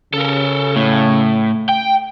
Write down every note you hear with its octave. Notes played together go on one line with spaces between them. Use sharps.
C#3 A4 A#4
A2
G5